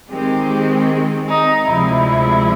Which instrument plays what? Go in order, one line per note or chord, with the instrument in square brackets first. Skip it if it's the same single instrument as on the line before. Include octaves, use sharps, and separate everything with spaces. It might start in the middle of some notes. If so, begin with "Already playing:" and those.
[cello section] D#3 G#3 C4 [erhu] G4
[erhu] D#4
[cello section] D2 C3 F3 G#3 [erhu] E4